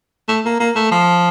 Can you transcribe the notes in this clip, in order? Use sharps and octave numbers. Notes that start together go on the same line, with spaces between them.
A3
A#3
A#3
A3
F3